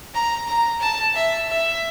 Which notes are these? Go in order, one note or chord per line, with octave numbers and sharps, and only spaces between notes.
A#5
A#5
A5
E5
E5